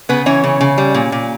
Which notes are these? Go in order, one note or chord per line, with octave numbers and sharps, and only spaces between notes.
C#3 B3 B4
E3 C#4 C#5
C#3
C#3
G3
A#2
A#2